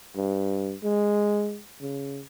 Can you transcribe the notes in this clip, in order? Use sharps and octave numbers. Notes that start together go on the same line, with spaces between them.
G2
G#3
C#3